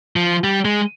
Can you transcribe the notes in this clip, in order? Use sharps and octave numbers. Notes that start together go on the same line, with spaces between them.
F3
G3
G#3